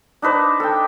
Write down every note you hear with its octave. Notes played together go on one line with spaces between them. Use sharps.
D4 D#4 B4 C5
A4 G5